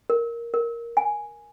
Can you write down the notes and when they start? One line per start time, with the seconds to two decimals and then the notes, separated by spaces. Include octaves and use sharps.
0.10 A#4
0.54 A#4
0.97 G#5